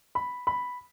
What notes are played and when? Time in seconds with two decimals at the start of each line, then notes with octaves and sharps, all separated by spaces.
0.15 B5
0.47 B5